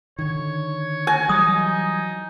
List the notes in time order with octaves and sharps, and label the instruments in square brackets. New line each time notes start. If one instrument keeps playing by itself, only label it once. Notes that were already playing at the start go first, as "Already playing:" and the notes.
[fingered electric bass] D3 D#3 [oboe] C#5
[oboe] F#4 [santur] G#5
[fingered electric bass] E3 F#3 G3 [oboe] D#4 [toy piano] D#6